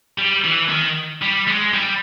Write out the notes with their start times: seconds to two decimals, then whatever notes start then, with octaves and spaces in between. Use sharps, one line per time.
0.18 G3
0.44 E3
0.69 D#3
1.22 G3
1.48 G#3
1.74 G3